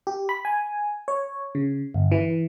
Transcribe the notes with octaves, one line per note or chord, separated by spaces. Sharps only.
G4
B5
G#5
C#5
C#3
G1
E3